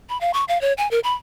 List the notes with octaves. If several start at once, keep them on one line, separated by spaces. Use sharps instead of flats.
B5
F5
C#6
F5
C#5
G#5
A#4
B5